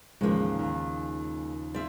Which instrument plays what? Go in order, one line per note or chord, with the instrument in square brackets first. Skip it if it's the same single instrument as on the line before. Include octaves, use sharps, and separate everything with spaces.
[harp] A1 D#2 [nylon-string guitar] C#3 F3 [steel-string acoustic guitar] G#3 A#3
[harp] D#2
[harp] C4 F4 G#4 [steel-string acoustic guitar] D5 E5